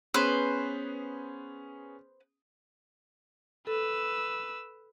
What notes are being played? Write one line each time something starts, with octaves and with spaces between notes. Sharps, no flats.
B3 C#4 G#4 B4 C5
A4 B4 E6